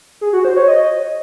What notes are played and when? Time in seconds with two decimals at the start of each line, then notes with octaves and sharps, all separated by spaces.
0.21 G#4
0.33 F#4
0.45 C5
0.56 C#5
0.68 D#5